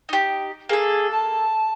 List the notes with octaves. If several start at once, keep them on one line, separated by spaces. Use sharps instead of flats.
D#4 G4
A#3 G#4 A4
A5